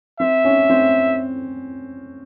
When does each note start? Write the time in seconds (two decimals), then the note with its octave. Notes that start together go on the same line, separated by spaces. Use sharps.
0.20 C4 E5
0.45 C#4
0.70 C4